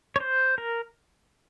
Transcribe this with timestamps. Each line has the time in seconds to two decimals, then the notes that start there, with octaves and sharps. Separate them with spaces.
0.16 C#5
0.20 C5
0.58 A#4